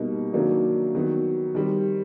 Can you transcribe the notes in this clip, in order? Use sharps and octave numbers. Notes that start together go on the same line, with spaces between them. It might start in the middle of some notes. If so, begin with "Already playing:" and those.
Already playing: B2 G3 A#3 D#4
C3 D#3 F#3 A#3 D4
D#3 F#3 B3
D#3 G3 C4